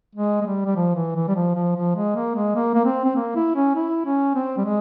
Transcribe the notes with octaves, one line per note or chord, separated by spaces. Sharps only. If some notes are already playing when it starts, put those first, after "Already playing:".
G#3
G#3
G3
G3
F3
E3
E3
G3
F3
F3
F3
G#3
A#3
G#3
A#3
A#3
C4
C4
A#3
E4
C#4
E4
C#4
C4
G3
G#3